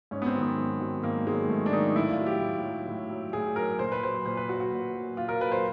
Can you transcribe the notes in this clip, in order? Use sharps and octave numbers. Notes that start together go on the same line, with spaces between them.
G#2 C#4
B3
C4
D#3 F#3
B3
G#2
D#3 F#3
G#2 A#3
D#3 F#3 G#3
G#2 A3
D4
D#3 F#3 D#4
A2 E4
F4
F#3
G4
A2
F#3
A2
F#3
A2 G#4
F#3 A#4
A#2 C5
B4
F#3 C5
A#2 C5
B4
F#3 F#4
F#4
A#2
F#3
A#2 F4
A#4
F#3 B4
C5